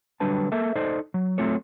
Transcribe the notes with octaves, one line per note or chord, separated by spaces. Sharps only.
D3 F#3 G3 D4 B4 A5
A#3 A4 A#4 E5
D#4 A4 C5 D5 D#5
F#3
F#3 A3 C4 F4 A4 C#5